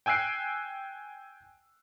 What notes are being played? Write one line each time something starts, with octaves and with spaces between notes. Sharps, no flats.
G5 G#5 E6 F#6 C7 D7